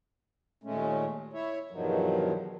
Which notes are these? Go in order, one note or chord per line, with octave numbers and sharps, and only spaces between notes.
D#2 A#2 G#3 A3 C#4
E4 C#5 E5
E2 G2 B2 D#3 F3 F#3